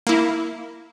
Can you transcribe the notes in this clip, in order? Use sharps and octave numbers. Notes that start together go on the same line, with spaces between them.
A#3 E4